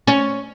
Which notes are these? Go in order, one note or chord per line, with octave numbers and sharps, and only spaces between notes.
C#4